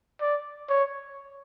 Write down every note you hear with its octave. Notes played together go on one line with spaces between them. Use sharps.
D5
C#5